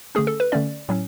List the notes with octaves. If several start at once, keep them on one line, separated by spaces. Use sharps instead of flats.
D3 A3 C#4 G#4
A4
B4
D3 A3 C#4 D5
A2 F#3 C#4